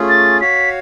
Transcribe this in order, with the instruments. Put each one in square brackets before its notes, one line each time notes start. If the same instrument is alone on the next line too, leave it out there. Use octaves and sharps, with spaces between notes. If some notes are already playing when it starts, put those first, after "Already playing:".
Already playing: [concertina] A3 C#4 F4 G#4
[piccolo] A6
[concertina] F#4 C#5 F5 [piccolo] B6